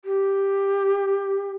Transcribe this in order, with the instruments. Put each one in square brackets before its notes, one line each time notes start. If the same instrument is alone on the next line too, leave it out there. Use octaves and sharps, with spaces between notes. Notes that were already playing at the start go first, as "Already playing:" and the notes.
[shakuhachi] G4